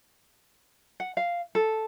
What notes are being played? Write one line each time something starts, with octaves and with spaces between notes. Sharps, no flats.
F#5
F5
A4